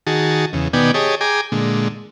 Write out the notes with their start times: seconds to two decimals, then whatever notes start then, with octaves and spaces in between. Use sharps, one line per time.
0.07 D#3 F#4 G#4 A5
0.53 E2 C#3
0.73 B2 D#3 B3 D5 G5 G#5
0.94 G4 G#4 C#5 D#5 A5
1.21 G#4 G5 G#5 A#5 D6
1.52 A#2 D3 G#3